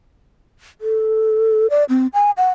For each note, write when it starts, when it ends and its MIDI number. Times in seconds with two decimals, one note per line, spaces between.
0.81 1.67 69
1.70 1.84 74
1.89 2.07 60
2.13 2.31 80
2.37 2.49 78